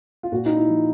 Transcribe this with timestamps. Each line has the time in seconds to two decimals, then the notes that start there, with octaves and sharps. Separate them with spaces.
0.23 F4
0.32 A#2 F#4
0.46 D#4
0.56 E4
0.69 F3